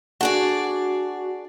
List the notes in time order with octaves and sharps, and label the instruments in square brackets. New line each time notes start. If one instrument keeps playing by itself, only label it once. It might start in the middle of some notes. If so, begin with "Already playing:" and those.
[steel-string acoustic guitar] D4 G#4 D5 [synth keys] F#4